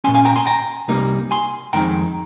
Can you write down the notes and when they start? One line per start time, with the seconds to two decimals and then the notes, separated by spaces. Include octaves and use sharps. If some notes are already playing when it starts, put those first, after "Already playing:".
0.04 A#2 G#3 C#4 G#5 C6
0.14 F5 G#5
0.25 G5 A#5
0.36 G#5 C6
0.46 G5 A#5
0.88 C2 C3 G3 A#3 D#4
1.31 G#5 C6
1.73 F2 D#3 G#3 C4 D#4 G5 A#5